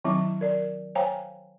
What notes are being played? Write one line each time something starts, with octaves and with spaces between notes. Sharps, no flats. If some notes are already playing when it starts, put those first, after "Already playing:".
D#3 F#3 C4 E4 E5 D6
A#4 D5
C5 C#5 F5 G5 G#5 A#5